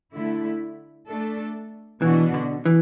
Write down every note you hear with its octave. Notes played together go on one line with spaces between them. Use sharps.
D3 A3 E4
A3 D4 A4
B2 E3 B3 D4 F#4
D3
E3